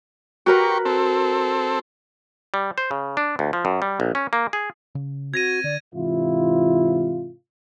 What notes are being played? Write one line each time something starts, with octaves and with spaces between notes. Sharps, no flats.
F#4 G4 A#4 B4 C#6
C4 A4
G3
C5
C#3
D4
D2
F3
F#2
G3
A#1
C#4
A#3
G#4
C#3
C4 F#4 G#6 A#6 D#7
D3 D5
G#2 C3 E3 E4 F4